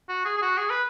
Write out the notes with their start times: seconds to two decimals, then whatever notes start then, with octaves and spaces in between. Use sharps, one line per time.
0.09 F#4
0.25 G#4
0.37 G#4
0.42 F#4
0.58 G#4
0.70 B4